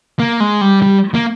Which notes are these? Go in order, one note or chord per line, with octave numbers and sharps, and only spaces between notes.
A#3
G#3
G3
G3
A#3